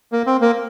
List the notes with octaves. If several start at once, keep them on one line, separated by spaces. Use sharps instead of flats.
A#3
C4
A#3